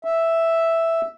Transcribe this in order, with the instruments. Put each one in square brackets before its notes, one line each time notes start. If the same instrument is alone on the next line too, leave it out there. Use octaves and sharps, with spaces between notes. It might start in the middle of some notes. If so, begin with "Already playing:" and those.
[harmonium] E5